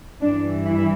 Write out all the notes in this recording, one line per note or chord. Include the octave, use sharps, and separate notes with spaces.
G2 E3 D4
E4